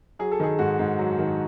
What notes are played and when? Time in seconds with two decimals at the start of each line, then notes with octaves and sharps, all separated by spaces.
0.19 F#3 G#4
0.31 A4
0.40 D#3 G#4
0.59 G#2 F#4
0.79 G#2
0.99 F#3
1.19 D#3